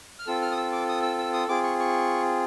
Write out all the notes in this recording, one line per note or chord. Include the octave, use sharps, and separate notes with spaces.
F6
C4 F4 A4 E6
F6
D#6
E6
D6
D#6
E6
E6
D#6
C4 F4 G#4 D6
C#6
C#6